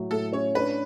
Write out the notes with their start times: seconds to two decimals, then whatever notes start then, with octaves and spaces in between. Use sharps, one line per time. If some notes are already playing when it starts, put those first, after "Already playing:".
Already playing: A2 F#3
0.11 A2 A4
0.33 C#4 C#5
0.55 D4 B4